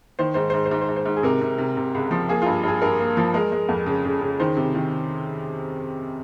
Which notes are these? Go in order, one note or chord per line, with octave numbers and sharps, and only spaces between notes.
D#3 C5
G#2 C5
C5
G#2
C5
G#2
C5
G#2
C5
G#2
G#4
C3 A#4
C3
C3
C3
C#2
F3
A#3 G#4
G2 F4
G2 G#4
G2 A#4
A#3
F3
G#3 A#4
G#3
F2
C#3
C#3
C#3
D#3 C5
C3
D#3